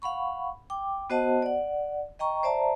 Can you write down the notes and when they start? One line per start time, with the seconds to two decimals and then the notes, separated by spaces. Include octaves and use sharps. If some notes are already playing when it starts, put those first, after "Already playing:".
0.02 F5 F#5 B5 C#6
0.70 G5 D6
1.10 B3 F#4 C5 D#5 F#5 A5
1.42 D5 F#5
2.19 D#5 G5 A#5 C#6
2.43 C5 D5 E5 A5 A#5